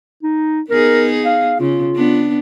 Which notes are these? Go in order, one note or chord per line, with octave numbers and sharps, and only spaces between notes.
D#4
B3 D#4 G#4 A#4
F5
C#3 F4
B3 D4